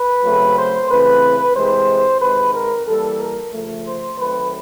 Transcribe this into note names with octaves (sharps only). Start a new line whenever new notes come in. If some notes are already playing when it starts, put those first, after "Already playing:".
Already playing: B4
C#3 F#3 A3 C4
C5
C#3 E3 A3 C4 B4
C3 E3 G#3 C5
C3 D#3 G#3 C4 B4
A#4
E3 G3 A#3 A4
A#4
C#3 F3 A3
C5
D#3 F#3 A3 C4 B4